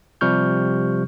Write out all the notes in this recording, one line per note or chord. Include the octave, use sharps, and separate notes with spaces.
C3 F3 G3 C#6 F6 G6